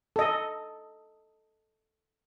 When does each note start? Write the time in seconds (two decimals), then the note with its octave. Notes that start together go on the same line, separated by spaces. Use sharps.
0.16 A4 D#5